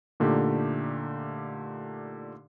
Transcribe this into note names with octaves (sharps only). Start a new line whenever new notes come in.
A#2 D3 A3 D#4 G4